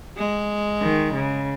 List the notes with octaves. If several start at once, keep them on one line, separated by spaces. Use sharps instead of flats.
G#3
D#3
C#3